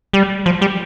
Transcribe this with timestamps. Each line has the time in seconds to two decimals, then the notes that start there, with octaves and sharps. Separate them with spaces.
0.13 G3
0.46 F3
0.61 G3